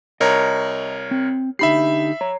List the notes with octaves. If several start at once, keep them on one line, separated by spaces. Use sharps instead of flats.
C2 A#4 C#5 D#5 A#5
C4
D3 D#4 G4 E5 B5 C7
C#5 A#5